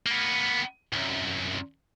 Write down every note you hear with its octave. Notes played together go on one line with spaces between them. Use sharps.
A#3 B3
C2 F#2